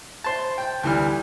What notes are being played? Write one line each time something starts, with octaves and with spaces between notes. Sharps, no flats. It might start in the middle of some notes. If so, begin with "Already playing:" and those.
C5 A5
G5
D2 E3 G3 F6